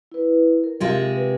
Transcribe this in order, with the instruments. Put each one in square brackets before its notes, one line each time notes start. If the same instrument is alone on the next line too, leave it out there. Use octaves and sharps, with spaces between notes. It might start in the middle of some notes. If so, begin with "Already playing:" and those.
[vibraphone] E4 B4
A#4
[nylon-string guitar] C3 G#3 F4
[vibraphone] B4